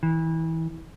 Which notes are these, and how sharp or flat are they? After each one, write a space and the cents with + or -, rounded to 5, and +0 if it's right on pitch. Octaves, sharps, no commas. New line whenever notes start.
E3 -25